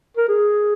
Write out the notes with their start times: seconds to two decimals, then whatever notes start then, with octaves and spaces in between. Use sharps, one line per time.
0.17 A#4
0.28 G#4